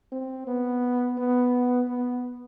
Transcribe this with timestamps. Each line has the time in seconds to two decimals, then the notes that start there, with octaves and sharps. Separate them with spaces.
0.12 C4
0.47 B3
1.18 B3
1.87 B3